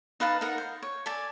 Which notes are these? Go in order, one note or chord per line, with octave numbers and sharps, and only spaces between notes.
D#4 B4 F5 A5
D#4 A#4 F#5
C5
C#5
A4 D5 G#5